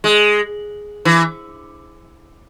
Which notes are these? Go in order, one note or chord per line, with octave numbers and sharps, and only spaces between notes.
G#3
E3